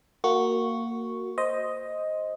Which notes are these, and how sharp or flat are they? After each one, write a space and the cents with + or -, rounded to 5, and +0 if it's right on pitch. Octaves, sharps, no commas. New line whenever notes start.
A#3 -15 F#4 +0 C#6 +0
C5 +0 D#5 +5